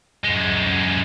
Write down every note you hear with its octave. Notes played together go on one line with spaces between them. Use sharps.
F#2 G#3